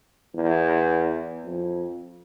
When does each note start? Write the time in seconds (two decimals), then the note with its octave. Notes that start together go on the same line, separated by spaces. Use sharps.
0.35 E2
1.44 F2